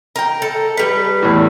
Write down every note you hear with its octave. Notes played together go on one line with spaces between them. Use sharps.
A#4 G5
A4
G3 B4
E2 A2